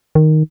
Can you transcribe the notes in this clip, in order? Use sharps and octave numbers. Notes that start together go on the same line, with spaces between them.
D#3